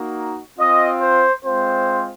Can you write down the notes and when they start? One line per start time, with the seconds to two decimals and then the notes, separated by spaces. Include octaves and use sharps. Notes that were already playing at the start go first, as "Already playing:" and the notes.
Already playing: A#3 D#4 F#4
0.59 C4 F4 D#5
1.02 C5
1.44 G#3 C4 F4 C5